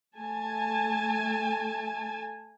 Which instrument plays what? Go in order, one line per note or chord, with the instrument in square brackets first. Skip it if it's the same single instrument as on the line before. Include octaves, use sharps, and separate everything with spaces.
[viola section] A3 G#5 A5